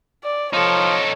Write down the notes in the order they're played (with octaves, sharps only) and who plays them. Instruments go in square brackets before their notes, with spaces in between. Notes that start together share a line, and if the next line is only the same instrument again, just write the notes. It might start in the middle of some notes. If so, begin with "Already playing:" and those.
[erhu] D5
[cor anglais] F3 [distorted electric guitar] D#4 A4 [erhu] C#5